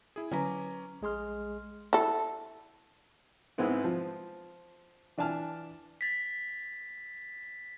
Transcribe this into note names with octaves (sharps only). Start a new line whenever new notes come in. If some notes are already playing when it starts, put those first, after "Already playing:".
E4 G#4
D3 F#3 C#4 B4 G#5 A#5 D6
A#1 G#3 G#4 C6 F6
E4 A4
G#2 G#3 B3 C4 E4
F3
E3 D4 G#5 A5 F6
A6 B6